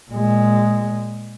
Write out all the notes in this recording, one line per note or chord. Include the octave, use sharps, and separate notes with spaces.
A#2 G#3